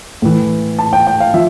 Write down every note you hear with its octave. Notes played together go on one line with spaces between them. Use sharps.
A2 E3
A5
G5
G5
F5
F3 E5